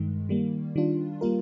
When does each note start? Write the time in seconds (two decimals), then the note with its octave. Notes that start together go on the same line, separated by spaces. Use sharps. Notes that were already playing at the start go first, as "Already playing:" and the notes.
Already playing: G2 D#3 G#3
0.29 D#3 G3 A#3
0.76 D#3 G3 D4 F4
1.21 G3 A#3 F4 A#4